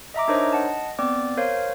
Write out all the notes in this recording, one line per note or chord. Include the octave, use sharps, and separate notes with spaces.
D#5 E5 A#5 D6
D4 D#4 A#4 C5 C#5 D#5
D#5 F#5 A5
B3 C4 D5 D6
A#4 C5 C#5 F5